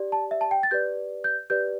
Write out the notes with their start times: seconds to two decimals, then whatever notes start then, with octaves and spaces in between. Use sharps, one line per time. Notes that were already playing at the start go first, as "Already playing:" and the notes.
Already playing: G4 D5
0.12 A5
0.31 E5
0.41 A5
0.51 G5
0.63 A6
0.71 G4 B4 D5 G6
1.24 G6
1.50 G4 B4 D5 G6